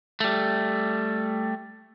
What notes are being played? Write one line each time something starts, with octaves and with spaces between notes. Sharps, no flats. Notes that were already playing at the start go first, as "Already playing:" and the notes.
G3 A3